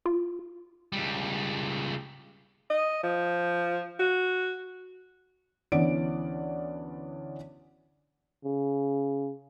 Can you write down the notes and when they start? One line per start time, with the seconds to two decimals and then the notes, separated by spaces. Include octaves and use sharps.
0.06 F4
0.92 C#2 G3
2.70 D#5
3.03 F3
4.00 F#4
5.72 D2 E3 B3 C#4 D5 D7
8.45 C#3